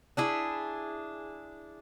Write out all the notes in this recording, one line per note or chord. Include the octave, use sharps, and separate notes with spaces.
D4 E4 G#4